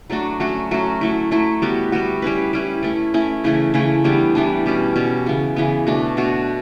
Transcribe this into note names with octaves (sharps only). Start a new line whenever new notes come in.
F#3 A3 D4 F#4
F#3 A3 C#4 F#4
F#3 A3 C#4 F#4
F#3 A3 E4
F#3 A3 E4
G3 B3 F#4
G3 B3 F#4
G3 C#4 E4 B4
G3 C#4 E4 B4
A3 C#4 E4
A3 C#4 E4
C#3 E3 A3 E4
C#3 E3 A3 E4
E3 G3 B3 D4
E3 G3 B3 D4
B2 G3 C#4
B2 G3 C#4
C#3 E3 B3
C#3 E3 B3
B2 A3 D4 F#4
B2 A3 D4 F#4